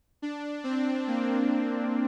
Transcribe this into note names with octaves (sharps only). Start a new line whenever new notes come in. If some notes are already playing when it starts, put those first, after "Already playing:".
D4
C4
A#3